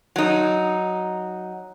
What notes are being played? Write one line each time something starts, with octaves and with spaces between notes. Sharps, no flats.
F#3 D#4